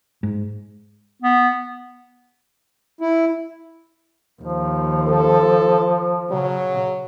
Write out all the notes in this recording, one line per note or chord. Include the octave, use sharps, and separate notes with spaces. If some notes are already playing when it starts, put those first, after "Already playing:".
G#2
B3
E4
D#2 F3
A4
C#3 F#3